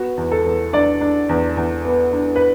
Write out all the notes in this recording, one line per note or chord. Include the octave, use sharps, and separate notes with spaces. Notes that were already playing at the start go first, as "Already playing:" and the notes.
Already playing: B3 F#4
E2
A4
E2
D4 D5
D4
E2
E2
B3
D4
B4